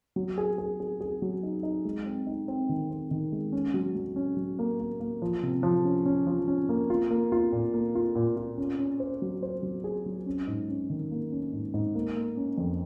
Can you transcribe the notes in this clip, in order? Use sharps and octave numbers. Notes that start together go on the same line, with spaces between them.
F#3
G#4
G#4
G#4
G#4
F#3
D#4
D#4
G#3
C4
D#4
C4
D#3
C4
D#3
G#3
C#4
F#3
F#3
C#4
F#3
A#3
A#3
A#3
F3
C3
F3
C#4
C#4
F3
C#4
A#3
F4
A#3
F4
A#2
A#3
F4
A#2
F4
C#4
C#4
C5
F#3
C5
F#3
G#4
F#3
C#4
G#2
C#4
D#3
A#3
C#4
G#2
G#2
A#3
A#3
C#4
F2